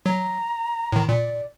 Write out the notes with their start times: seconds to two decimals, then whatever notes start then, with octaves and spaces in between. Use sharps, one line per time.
0.06 F#3 A#5
0.93 A2 D#3
1.09 A#2 D5